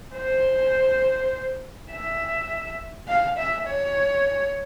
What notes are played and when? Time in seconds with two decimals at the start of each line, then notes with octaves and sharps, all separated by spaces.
0.16 C5
1.91 E5
3.08 F5
3.38 E5
3.67 C#5